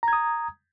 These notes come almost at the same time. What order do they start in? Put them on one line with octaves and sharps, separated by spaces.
A#5 G#6 D#6